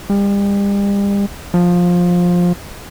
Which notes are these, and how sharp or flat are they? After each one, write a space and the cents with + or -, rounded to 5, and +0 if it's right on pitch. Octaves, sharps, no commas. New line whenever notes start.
G3 +40
F3 +15